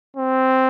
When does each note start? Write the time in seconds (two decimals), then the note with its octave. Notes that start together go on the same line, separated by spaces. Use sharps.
0.17 C4